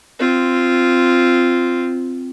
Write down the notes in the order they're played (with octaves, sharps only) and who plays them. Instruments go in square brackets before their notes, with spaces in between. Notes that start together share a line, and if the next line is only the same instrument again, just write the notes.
[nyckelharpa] C4 F4